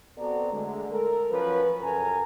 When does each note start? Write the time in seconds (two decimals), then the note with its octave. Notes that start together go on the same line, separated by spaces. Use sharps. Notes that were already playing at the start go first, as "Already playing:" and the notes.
0.18 B3 C4 F#4 A4 D5 A#5
0.53 D3 G#3 A3
0.91 A4 A#4
1.31 F3 F#3 C#4 B4
1.82 F#2 C#3 A4 A#4 G#5 A#5